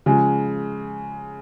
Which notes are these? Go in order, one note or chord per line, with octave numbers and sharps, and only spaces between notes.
C#3 F3 G#3